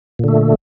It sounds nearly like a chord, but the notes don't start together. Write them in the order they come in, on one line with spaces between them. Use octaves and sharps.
A#2 D3 A3